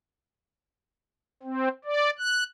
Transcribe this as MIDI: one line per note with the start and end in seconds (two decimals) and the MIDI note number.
1.43 1.68 60
1.85 2.10 74
2.19 2.44 90